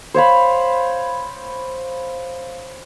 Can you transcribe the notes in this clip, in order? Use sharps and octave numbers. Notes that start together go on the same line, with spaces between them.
C5 C#5 F5 B5